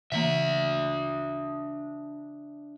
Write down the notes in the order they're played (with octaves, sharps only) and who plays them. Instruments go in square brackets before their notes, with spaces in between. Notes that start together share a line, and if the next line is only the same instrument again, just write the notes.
[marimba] C#3 E3 A#3 [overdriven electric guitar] D4 E5